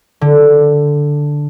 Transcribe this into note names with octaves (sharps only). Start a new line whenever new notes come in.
D3